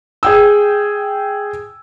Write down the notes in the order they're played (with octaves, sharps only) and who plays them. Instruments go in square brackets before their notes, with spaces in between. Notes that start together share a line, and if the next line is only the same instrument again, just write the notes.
[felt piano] G#4 G5 E6